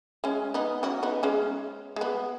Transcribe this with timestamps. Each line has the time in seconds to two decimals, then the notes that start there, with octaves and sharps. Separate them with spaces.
0.24 G#3 C#4
0.54 B3 D#4
0.83 C#4 F#4
1.03 B3 D#4
1.23 G#3 C#4
1.96 G#3
2.01 B3